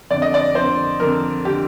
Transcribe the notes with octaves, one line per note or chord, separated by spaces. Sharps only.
F2 D3 D5
D#5
D5
F2 D3 C5
F2 D3 A#4
D3 G4